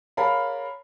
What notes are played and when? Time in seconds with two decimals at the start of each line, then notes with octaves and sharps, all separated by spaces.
0.17 G#4 A#4 C#5 F5 A5 B5